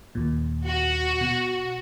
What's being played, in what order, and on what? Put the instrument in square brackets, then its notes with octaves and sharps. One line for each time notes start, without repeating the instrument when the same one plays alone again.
[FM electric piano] D#2 A#2
[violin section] F#4
[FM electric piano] B2